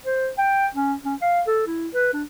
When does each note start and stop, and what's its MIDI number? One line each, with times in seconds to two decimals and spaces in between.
0.05 0.30 72
0.38 0.67 79
0.75 0.95 61
1.05 1.15 61
1.21 1.41 77
1.47 1.62 69
1.67 1.88 64
1.94 2.09 71
2.13 2.23 62